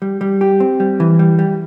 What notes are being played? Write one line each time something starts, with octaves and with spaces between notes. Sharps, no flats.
G3
G3
G4
C4
G3
E3
G3
G3